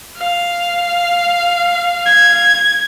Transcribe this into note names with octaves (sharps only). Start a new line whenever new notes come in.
F5
G#6